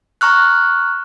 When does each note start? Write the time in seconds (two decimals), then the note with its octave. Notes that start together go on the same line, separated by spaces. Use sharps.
0.21 A#5 C#6 F6 F#6